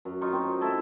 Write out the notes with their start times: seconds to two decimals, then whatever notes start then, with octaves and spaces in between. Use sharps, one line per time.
0.05 F#2
0.21 D#4 F4 C#6
0.33 C4
0.61 A3 E4 A4